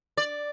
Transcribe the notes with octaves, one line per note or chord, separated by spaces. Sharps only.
D5